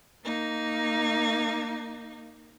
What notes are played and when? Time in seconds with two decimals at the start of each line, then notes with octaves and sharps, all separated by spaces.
0.23 A#3 D#4